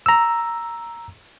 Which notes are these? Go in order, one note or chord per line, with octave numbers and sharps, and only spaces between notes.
A#5 E6